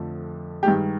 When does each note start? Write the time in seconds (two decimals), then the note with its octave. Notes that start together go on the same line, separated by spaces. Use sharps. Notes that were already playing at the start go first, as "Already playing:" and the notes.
Already playing: F2 D3 F3 A3
0.63 G2 D#3 G#3 G4